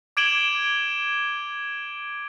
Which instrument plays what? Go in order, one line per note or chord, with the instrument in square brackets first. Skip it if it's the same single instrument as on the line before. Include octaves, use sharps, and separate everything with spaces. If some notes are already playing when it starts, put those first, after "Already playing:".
[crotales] D6 G#6 D7 E7 F#7 G7